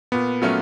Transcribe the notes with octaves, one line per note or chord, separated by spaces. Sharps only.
A#2 B3
F#3 A3 C#4 F4